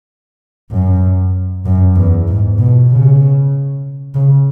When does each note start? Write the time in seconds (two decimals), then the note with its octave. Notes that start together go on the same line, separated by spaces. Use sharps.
0.71 F#2
1.66 F#2
1.96 E2
2.28 G#2
2.59 B2
2.90 C#3
4.15 C#3